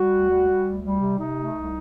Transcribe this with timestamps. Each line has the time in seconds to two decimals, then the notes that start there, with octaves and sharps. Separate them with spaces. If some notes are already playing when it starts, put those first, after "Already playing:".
Already playing: G3 F#4
0.11 D2
0.29 G3
0.46 G3
0.64 D2
0.83 G3
1.00 C3
1.18 C3 D#4
1.36 A3
1.55 C2